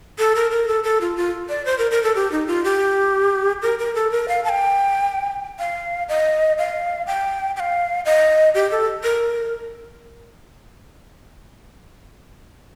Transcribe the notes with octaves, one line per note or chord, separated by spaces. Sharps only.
A4
A#4
A#4
A4
A4
F4
F4
D5
C5
A#4
A#4
A4
G4
D#4
F4
G4
A#4
A#4
A4
A#4
F5
A5
G5
F5
D#5
F5
G5
G5
F5
D#5
G4
A4
A#4